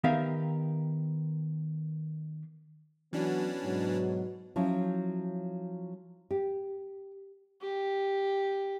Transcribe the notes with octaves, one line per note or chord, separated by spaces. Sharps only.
D#3 B3 G4 A#4 E5 F5
E3 F#3 B3 C#4 D4 F#4
G#2 B2 F#3
F3 F#3 C#4 E4
G4
G4